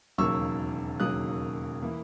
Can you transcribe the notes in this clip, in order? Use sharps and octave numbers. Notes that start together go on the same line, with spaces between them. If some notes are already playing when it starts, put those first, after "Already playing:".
E1 D#2 C#3 F#3 A#3 C#6 E6
E1 D#2 C#3 F#3 A#3 D#6 F#6
E3 A#3